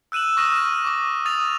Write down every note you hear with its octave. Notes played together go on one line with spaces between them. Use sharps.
E6 F#6 D#7 E7 F#7
C#6 D#6 F6 A#6 D#7 E7
F6 D#7
C#6 D6 D#7
D#6 A6 D#7 F7